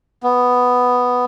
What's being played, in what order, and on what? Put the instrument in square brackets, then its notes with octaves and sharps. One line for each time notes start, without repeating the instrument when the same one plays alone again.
[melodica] B3